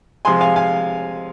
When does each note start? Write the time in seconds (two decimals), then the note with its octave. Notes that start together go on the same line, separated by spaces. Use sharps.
0.25 C3 F3 G#3 G#5 C6
0.41 F5 G#5
0.56 F5 G#5